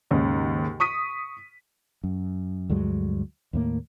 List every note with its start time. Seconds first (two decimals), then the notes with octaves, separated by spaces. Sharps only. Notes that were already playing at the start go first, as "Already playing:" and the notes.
0.11 D#2 G#2 C#3
0.80 C#6 D#6 B6 D#7
2.04 F#2
2.70 D2 G2 F#3 G#3
3.53 D#2 A2 A#3